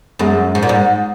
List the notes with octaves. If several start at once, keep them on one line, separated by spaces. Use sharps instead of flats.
F#2 G#3
G#2
A#2
G#2